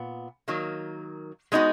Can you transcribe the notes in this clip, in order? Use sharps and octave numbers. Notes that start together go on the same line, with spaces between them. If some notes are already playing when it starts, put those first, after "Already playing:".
Already playing: A#2 B3
D#3 F#3 A#3
G#3 B3 D#4 F#4